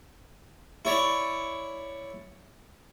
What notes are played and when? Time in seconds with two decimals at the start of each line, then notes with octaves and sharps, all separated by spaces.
0.85 E4 C#5 D5